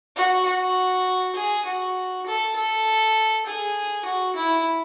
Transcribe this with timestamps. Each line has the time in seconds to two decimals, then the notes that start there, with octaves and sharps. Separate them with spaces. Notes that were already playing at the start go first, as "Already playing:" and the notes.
0.16 F#4
0.46 F#4
1.35 G#4
1.65 F#4
2.26 A4
2.56 A4
3.46 G#4
4.05 F#4
4.36 E4